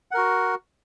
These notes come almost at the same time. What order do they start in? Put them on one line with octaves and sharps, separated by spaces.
F#5 A#4 F#4